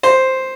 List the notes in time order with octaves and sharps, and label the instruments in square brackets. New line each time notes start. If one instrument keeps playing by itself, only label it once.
[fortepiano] C5